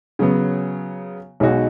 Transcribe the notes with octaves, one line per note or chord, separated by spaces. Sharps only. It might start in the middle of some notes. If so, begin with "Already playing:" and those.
C#3 F#3 B3
B1 B2 G#3 D#4 F#4